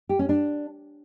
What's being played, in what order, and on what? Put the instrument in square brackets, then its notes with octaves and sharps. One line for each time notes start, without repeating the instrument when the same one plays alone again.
[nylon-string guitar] G4
C#4
D4